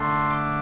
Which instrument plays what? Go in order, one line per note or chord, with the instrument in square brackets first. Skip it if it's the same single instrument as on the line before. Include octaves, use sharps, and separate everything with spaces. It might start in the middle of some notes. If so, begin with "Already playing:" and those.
Already playing: [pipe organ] D3 A3 D4 C6
D6